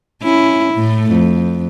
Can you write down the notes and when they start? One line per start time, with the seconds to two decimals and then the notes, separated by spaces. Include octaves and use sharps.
0.23 C#4 E4
0.74 A2 A3
1.12 F2